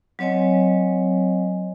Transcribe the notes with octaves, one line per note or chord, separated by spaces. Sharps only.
F#3 C4 C#5 D#5 G#5